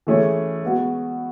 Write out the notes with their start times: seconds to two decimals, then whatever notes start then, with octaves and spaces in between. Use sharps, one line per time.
0.07 E3 A3 C#4 G#4 C#5
0.62 G#3 B3 F#4